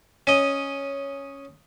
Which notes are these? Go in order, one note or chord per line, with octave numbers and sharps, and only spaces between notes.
C#4 D#5